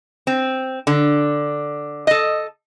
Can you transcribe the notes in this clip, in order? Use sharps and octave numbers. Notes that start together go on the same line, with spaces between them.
C4
D3
A4 D#5